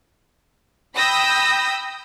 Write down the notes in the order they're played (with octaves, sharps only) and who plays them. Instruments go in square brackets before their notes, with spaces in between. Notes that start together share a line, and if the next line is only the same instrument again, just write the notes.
[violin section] G5 B5 D#6 E6 G6 A#6